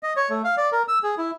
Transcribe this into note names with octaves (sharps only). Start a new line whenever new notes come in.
D#5
C#5
A3
F5
D5
A#4
E6
G#4
E4